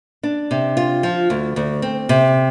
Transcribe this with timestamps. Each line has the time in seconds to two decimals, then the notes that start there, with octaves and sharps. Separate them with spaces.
0.23 D4
0.51 C3
0.77 F4
1.03 F3
1.30 D2
1.56 D2
1.82 C4
2.09 C3